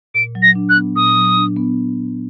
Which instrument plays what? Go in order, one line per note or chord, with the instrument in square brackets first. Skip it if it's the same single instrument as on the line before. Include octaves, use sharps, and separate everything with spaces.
[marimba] A#2 [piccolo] D7
[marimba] F#3
[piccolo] A#6
[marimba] D4
[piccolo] F#6
[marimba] B3
[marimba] A#2 [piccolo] D#6
[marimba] F#3
D4
B3